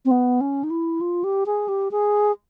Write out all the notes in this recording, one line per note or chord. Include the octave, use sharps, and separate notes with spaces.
C4
B3
C#4
D#4
E4
F4
G4
G#4
G4
G#4